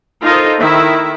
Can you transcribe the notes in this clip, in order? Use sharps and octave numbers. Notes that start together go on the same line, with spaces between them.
D#4 F4 A4 A#4 C5 D#5
D#3 E4 E5